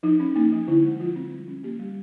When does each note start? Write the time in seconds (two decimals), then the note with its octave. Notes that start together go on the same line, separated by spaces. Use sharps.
0.03 F3 D#4
0.20 C#4
0.36 A#3 D#4
0.52 F3
0.68 D3 E4
0.84 G#3
1.00 F3 F4
1.16 C4
1.32 G3
1.48 C#4
1.63 A#3 G4
1.80 G3